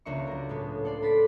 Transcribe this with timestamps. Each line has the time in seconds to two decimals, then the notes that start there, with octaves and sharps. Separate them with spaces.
0.05 C#2 A#3 D4 E5 C6 C#6
0.27 F#3 A#4
0.49 A2 G#3 B3
0.85 A4 D5 C6
1.02 D4 B5 C6 A6 B6 D7